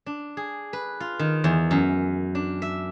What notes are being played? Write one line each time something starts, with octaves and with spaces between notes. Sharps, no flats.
D4
G#4
B4
F4
D#3
E2
F#2
D4
E5